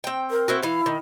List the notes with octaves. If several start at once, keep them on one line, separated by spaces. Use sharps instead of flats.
C4 G5
A#4
C4 E4 F#4
E3 E4 F5
D#3